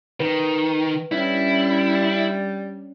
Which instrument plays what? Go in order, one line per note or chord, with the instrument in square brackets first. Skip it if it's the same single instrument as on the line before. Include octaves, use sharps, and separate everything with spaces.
[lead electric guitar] D#3 [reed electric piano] B4
[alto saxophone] G3 [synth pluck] C#4 D4 [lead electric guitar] E4